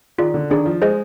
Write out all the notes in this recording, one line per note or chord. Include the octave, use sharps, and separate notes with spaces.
D#3 F4 G#4 D5
D3
D#3 D4 G#4 D5
F3
G#3 G#4 C5 D#5